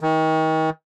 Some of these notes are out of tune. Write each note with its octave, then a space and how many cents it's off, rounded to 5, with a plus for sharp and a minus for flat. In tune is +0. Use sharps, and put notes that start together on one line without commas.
D#3 +35